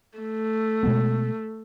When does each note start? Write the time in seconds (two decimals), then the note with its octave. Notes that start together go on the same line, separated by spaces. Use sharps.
0.18 A3
0.83 B2 G#3 B3